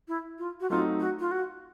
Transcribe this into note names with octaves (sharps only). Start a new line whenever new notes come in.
E4
F4
F#4
F#3 A3 C4 D#4 F4
F#4
F4
F#4